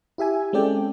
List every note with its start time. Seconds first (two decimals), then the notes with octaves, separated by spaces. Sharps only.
0.18 E4 G4 E5 G#5
0.53 G#3 C4 C#4 A4 D5 G5